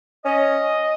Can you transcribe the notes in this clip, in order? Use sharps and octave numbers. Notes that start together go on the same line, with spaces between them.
C#4 D#5